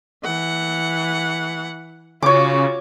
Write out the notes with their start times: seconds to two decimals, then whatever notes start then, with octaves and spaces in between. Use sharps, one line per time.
0.24 E3 F#5
2.22 C#3 F4 F#4 C#5 D6